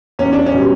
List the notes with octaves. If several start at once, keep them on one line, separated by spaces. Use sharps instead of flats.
E2 C#4
D4
C#4
B2 G3